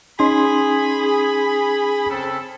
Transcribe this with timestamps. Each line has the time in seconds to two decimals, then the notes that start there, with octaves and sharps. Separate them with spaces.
0.20 C#4 D#4 G#4 B5 C6
2.10 C#3 C4 A4